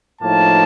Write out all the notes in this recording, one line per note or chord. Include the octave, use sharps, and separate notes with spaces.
A2 F3 A#3 D#4 A5